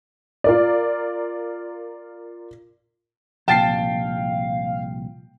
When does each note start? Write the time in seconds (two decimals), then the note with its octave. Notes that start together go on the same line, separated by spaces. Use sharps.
0.44 F4 A#4 D5
3.48 C2 A#2 F3 F5 G5 A5 A6 C7